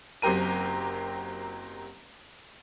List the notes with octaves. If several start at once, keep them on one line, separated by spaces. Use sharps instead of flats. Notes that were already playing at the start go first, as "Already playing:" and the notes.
F#1 F#3 C4 G4 A#4 D#7